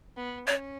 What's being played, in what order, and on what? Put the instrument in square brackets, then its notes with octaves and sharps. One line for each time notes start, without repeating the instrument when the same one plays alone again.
[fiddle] B3
[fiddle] C#4 [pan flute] C#5